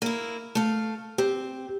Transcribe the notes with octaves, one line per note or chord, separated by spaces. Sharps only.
A#3 E4
A3 F5
C4 G4